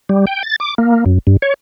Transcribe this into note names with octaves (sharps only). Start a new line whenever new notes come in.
G3
G5
A6
D6
A#3
F#2
G2
C#5